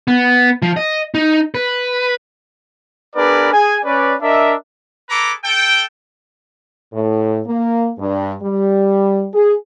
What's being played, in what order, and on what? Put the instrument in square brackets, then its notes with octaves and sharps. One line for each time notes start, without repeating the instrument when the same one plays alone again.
[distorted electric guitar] B3
F3
D#5
D#4
B4
[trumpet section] B3 D4 G#4 A#4 B4 D5
G#4 G#5
C#4 B4 D5
D4 A#4 D#5 E5
G#4 A4 B4 A#5 D6
A4 G5
[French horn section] A2
A#3
G2
G3
G#4